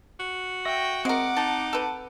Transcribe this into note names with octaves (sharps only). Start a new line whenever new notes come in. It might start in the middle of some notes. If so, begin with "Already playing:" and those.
F#4
E5 G5 C#6 A#6
G#3 C4 A#4 F#5 D6
D#4 A5
A4 B4